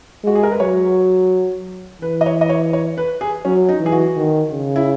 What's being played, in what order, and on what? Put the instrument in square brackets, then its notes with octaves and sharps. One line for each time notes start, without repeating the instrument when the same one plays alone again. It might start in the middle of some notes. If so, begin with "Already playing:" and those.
[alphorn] G#3 [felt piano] F#4
[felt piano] G#4
A#4
B4
[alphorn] F#3 [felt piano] C#5
[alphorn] E3 [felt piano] B4
[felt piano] D#5
C#5
D#5
C#5
C#5
B4
G#4
[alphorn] F#3 [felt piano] C#4
[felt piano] D#4
[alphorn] E3
[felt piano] G#4
F#4
[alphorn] D#3
C#3
[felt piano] E4